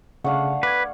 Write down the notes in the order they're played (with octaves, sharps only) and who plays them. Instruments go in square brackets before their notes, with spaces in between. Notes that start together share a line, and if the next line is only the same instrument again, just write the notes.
[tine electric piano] C#3 [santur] A3 D4 [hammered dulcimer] F5 F#5
[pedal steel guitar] B4 [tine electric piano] D6 G#6